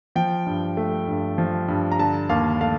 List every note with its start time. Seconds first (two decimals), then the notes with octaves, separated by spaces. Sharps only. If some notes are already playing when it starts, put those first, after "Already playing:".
0.16 F3 G5
0.46 G2
0.77 A3
1.08 G2
1.38 F3
1.68 G2
1.91 A#5
1.99 D3 A5
2.29 D#2 F5
2.61 A3 F5